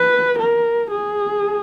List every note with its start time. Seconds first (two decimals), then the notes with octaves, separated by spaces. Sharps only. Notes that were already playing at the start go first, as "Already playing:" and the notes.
Already playing: B4
0.39 A#4
0.91 G#4